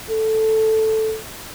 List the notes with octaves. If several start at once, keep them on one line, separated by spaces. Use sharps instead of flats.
A4